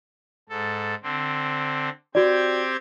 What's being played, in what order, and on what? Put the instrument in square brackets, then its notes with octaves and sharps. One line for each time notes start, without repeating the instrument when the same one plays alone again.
[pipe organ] G#2 A4
D3 C4
[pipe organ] C4 G4 G#6 [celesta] F#4 D5